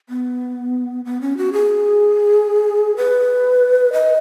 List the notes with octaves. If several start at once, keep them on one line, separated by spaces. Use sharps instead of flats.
B3
B3
C#4
F#4
G#4
B4
D#5